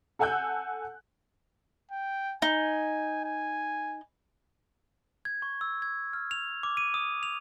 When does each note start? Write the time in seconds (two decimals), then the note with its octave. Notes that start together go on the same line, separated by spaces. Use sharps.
0.19 A4 F#5 G#5 E6 F#6 G6
1.91 G5
2.42 D#4 G#5
3.25 G#5
5.25 G#6
5.42 C#6
5.61 E6
5.82 G#6
6.13 F6
6.31 F7
6.63 D6
6.77 D#7
6.94 D#6
7.23 F7